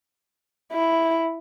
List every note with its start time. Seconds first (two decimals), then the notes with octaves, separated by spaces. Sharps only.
0.73 E4